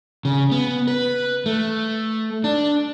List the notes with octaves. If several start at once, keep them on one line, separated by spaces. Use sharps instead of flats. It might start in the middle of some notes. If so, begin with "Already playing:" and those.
C#3
B3
B4
A3
D4